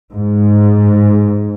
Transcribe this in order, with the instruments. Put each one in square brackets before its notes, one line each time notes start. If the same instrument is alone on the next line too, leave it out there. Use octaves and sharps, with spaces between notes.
[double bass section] G#2